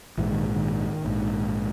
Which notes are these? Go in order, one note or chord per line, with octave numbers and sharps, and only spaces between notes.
A#1 G#2 E3
D#3
D#3
A#1 G#2